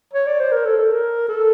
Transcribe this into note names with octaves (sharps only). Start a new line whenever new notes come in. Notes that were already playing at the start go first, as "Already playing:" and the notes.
C#5
D5
C5
A#4
A4
A4
A#4
A4